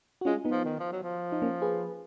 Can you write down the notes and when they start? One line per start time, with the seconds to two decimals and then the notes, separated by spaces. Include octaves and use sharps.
0.21 F#4
0.25 G#3 C#4 F4
0.45 B3 D#4
0.52 F3
0.65 D#3
0.79 F3
0.92 F#3
1.03 F3
1.32 D#4
1.42 A#3 C#4
1.62 G#4 B4